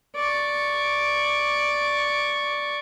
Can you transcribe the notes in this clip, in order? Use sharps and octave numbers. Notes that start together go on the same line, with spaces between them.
D5 C#6